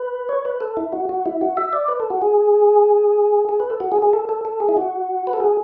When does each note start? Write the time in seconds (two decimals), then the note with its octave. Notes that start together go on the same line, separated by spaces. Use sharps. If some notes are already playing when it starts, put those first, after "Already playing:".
Already playing: B4
0.29 C#5
0.45 B4
0.60 A4
0.77 E4
0.92 F#4
1.09 F#4
1.26 E4
1.41 F#4
1.57 E5
1.73 D5
1.88 B4
2.00 A4
2.10 F#4
2.22 G#4
3.49 G#4
3.60 B4
3.70 A4
3.80 F#4
3.92 G#4
4.02 G#4
4.13 A4
4.29 A4
4.45 A4
4.60 G#4
4.69 E4
4.77 F#4
5.27 B4
5.33 A4
5.40 G#4